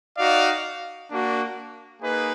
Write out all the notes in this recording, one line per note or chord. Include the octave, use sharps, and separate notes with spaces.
D#4 F#4 D5 F5
A#3 D4 F#4
A#3 D#4 G#4 B4